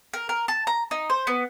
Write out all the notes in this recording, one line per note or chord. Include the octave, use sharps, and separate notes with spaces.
A#4
A#4
A5
A#5
D#4
C5
B3